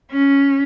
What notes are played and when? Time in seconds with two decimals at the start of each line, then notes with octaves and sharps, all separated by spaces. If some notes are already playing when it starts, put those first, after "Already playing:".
0.12 C#4